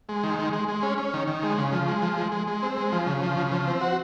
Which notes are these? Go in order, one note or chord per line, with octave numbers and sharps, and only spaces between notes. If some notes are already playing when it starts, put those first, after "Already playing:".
G#3
D#3
G#3
G#3
G#3
C#4
C#4
D#3
D#3
G#3
C#3
F3
G#3
F3
G#3
G#3
G#3
C4
G#3
F3
C#3
F3
C#3
F3
C4
F#4